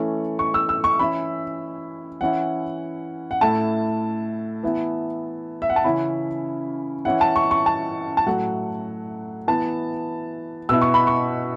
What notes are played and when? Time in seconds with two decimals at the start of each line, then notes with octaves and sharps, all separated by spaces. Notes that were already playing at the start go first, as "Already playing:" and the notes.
Already playing: E3 A3 C#4
0.39 C#6
0.54 E6
0.69 E6
0.84 C#6
0.99 E3 C#4 E4 B5
2.21 E3 C#4 E4 F#5
3.31 F#5
3.41 A2 A3 E4 A5
4.63 E3 B3 E4
5.62 E5
5.70 F#5
5.76 A5
5.84 C#3 E3 C#4 E4 B5
7.05 E3 C#4 E4 F#5
7.21 A5
7.36 C#6
7.51 C#6
7.66 A5
8.17 A5
8.27 A2 F#3 A3 F#5
9.47 E3 B3 E4 A5
10.69 B2 B3 E4 E6
10.81 C#6
10.94 B5
11.07 C#6